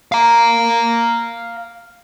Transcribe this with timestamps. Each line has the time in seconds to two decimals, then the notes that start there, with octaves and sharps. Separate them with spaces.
0.12 F5 A#5